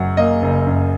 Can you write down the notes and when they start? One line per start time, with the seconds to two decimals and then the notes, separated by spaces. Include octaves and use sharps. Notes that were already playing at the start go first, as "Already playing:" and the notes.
Already playing: F#1 F#2 F#3 F#5
0.17 A#3 D#5
0.42 F#1
0.67 F#2